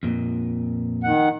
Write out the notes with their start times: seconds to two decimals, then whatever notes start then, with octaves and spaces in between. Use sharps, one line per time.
0.03 F2 A#2
1.04 D#3 F#5